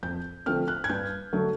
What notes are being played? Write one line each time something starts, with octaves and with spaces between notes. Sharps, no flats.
F2 G6
D3 F3 A3 C4 F6
F#6
G#6
G2 G6
D3 F#3 A3